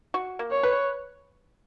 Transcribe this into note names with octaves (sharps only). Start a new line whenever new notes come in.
F#4
A#3
C#5
B4